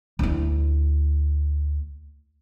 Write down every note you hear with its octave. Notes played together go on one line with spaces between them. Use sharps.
D2 E4